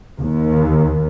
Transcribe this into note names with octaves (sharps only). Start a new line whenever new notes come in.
D#2